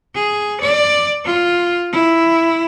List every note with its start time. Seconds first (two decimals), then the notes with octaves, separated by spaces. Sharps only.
0.15 G#4
0.61 D5
1.25 F4
1.92 E4